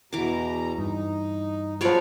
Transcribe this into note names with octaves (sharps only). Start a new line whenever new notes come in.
E2 B2 E3 A#5 D6
G2 D#4
F3 F#3 G#3 F4 F#4 B4 C#5 D5